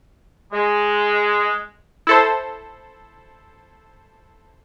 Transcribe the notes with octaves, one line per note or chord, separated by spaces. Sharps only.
G#3
E4 A4 C5